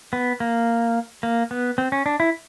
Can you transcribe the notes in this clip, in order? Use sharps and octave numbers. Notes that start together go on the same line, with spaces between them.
B3
A#3
A#3
B3
C4
C#4
D4
E4